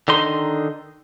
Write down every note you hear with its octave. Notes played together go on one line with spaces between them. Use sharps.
D3 D#3 D#4 C6